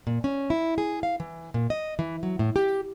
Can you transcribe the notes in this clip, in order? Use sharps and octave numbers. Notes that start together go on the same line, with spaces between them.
A#2
C#4
E4
G#4
F5
E3
A#2
D#5
E3
F#3
A2
G4